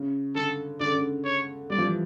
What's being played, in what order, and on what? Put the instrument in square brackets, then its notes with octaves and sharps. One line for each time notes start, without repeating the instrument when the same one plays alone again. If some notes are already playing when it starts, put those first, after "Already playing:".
Already playing: [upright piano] C#3
[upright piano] D3 [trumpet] A4
[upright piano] D3 [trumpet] D5
[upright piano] C#3
D3
[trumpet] C#5
[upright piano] G3 [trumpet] D5
[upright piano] F3
E3